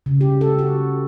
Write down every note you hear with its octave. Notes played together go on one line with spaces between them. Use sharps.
C#3
G4
A4
F#4